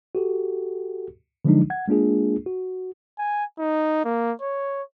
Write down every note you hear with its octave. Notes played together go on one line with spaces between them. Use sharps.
F#4 G4 A4
D3 F3 F#3 G#3 D4 D#4
F#5 G#6
G#3 A#3 D4 F4 G#4
F#4
G#5
D#4
A#3
C#5